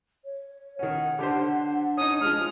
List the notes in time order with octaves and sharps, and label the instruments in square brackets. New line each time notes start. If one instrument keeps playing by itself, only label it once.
[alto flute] C#5
[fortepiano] D#3 C#4 [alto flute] F#5
[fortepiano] D3 G4 C5 [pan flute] D4
[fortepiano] C#4 D#4 [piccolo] D#6
[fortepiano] F3 G#3 [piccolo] F6